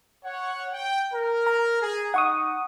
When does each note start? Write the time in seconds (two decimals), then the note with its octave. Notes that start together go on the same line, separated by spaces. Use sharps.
0.24 C#5 F#5
0.73 G5
1.13 A#4
1.47 A#5
1.81 G#4
2.14 D#4 F#5 C#6 D#6